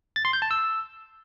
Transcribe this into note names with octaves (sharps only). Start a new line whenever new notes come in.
A6
C6
G6
A5
E6